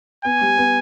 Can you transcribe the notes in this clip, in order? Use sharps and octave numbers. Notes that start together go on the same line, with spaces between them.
B3 G#5
G3
B3